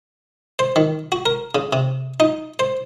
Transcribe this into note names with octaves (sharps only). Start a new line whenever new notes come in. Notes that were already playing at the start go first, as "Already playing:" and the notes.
C5
D#3
F#4
A#4
C#3
C3
D#4
C5